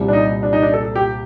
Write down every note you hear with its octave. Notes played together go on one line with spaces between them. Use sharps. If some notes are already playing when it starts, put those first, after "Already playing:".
Already playing: C2 A#2 G3 C4
D4
D#4
D4
D#4
D4
A4
G4